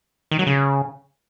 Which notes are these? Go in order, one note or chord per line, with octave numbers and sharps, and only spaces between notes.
D#3
F#3
C#3